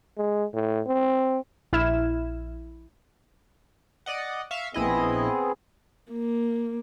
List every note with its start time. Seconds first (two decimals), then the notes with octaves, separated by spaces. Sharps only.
0.18 G#3
0.54 A2
0.87 C4
1.73 A#1 E4 E5 F6 G#6 E7
4.06 D5 D#5 F#5
4.51 E5 F5 C#6
4.74 A#1 B3 C4 E4 G#4 D#5
6.12 A#3